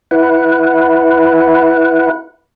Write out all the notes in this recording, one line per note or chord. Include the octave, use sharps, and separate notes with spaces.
E4 B4 F#5